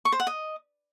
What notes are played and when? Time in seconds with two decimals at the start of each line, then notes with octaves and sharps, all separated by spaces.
0.05 C#6
0.12 C5
0.20 F#5
0.27 D#5